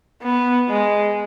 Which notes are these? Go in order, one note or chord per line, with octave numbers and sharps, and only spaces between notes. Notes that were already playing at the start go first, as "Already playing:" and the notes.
B3
G#3